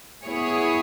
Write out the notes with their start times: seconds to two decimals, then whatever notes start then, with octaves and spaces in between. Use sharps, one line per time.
0.24 B3 E4 G#4 C#5